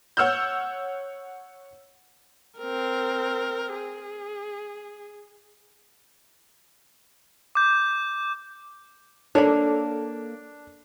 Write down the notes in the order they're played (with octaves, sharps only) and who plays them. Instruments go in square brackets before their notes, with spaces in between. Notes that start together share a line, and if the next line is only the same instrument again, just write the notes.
[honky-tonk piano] C#5 F#5 E6 F6 G6
[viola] C4 A#4
G#4
[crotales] D6 G6
[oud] A#3 A4 [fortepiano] D4 [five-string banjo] C#5 B5